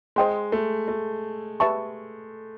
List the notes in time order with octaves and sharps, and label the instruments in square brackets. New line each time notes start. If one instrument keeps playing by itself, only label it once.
[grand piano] G#3 [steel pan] C5 D#5 G5 C6
[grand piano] A3
A3
[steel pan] G4 B4 E5 A5 C#6